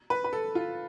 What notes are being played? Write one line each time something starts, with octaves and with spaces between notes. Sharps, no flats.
B4
B4
A4
F4